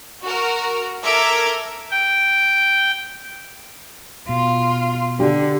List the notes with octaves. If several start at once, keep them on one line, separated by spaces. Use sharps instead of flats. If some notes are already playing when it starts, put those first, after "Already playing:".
F#4 A#4
A4 A#4 E5 D6 G#6
G5
B2 F4
D3 G4